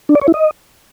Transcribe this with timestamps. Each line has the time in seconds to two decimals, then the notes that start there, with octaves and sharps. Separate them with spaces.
0.09 D4
0.15 D5
0.21 C#5
0.28 E4
0.34 D#5